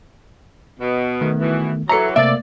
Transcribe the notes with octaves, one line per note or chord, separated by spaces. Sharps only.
B2
D#3 A3 B3
B2 E3
E3 F#3 A4 E5 A#5 C#7
C3 A3 A#3 D5 E5